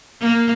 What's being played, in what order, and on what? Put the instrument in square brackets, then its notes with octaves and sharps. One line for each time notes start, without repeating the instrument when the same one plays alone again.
[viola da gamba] A#3